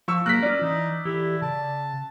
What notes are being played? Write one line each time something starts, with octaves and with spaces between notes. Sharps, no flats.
F3 C#6 E6
F#3 G#3 A#3 A#4 F#6 B6
C#4 F4 D5
E3 D#4
E3 E4 G4 A4
C#3 A5